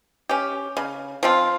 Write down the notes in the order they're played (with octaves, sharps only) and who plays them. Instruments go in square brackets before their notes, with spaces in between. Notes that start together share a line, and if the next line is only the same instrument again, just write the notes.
[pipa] C#4 G4
C#3
F3 C4 F4